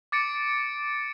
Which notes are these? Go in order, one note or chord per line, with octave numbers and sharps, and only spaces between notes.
D6 A6 C#7 D7